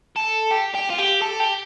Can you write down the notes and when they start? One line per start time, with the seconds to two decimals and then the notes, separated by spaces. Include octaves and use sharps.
0.16 A4
0.51 G4
0.75 G4
0.90 F4
0.98 G4
1.22 A4
1.40 G4